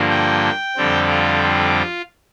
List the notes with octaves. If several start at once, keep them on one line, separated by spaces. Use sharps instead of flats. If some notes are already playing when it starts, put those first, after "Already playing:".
Already playing: G2 D3 F3 A#3
G5
F2 D3 G3 C4
F4
F4